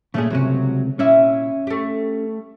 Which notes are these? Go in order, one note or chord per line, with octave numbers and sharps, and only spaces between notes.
A#2 C#3 A3 C#4 G#4
C#2 C3 F#3 C#4
A#2 C#4 E4 E5
A3 G4